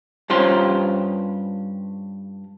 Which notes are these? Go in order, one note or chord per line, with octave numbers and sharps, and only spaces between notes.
G2 C#4 F4 G4 C5 C6